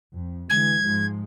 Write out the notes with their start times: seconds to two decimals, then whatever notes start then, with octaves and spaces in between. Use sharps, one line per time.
0.14 F2
0.49 D3 E3 G#3 G#6
0.81 G#2 F3 G#3